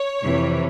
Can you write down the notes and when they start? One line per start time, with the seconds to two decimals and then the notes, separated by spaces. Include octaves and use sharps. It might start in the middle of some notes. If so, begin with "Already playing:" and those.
Already playing: C#5
0.24 F2 C3 E3